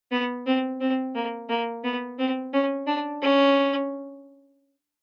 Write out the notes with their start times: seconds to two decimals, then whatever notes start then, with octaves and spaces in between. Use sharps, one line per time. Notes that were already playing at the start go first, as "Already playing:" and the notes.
0.11 B3
0.46 C4
0.81 C4
1.15 A#3
1.49 A#3
1.84 B3
2.18 C4
2.53 C#4
2.87 D4
3.22 C#4